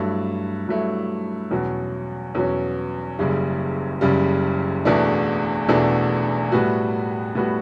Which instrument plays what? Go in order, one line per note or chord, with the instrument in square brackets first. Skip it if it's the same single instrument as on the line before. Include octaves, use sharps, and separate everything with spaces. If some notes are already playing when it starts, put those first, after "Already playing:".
Already playing: [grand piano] G2 F#3 A3 E4
G2 F#3 A3 E4
E2 B2 F#3 C#4
E2 B2 F#3 C#4
F#1 F#2 C#3 G3
F#1 F#2 C#3 G3
E1 E2 B2 A3 D4
E1 E2 B2 A3 D4
A2 G3 B3 F#4
A2 G3 B3 F#4